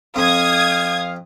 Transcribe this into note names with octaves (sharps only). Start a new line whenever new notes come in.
F2 F5 D#6 G#6